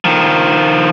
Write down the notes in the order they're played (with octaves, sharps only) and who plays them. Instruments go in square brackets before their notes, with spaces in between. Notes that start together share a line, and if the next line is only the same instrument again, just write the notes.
[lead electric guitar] D#3 F3